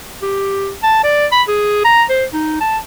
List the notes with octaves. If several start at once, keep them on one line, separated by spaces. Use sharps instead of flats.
G4
A5
D5
B5
G#4
A#5
C5
D#4
A5